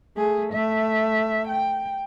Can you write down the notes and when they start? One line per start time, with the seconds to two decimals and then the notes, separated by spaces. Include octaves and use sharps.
0.16 A3 G#4
0.53 A3 E5
1.48 G5